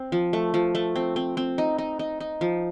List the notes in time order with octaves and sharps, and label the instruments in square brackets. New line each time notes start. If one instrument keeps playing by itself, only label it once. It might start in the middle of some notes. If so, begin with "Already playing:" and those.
Already playing: [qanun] C4
F3
A3
F3
A3
C4
C4
C4
D#4
D#4
D#4
D#4
F3